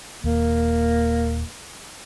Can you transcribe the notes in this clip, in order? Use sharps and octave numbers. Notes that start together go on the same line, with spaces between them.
D#1 D#2 A#3